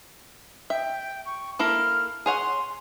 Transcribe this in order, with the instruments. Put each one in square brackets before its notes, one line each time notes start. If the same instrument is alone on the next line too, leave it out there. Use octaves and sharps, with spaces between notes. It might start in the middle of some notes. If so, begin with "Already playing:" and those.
[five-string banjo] E5 [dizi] G5
[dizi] C#6
[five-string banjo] A#3 E4 A4 [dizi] F6
[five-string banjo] G#4 C#5 F#5 [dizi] C6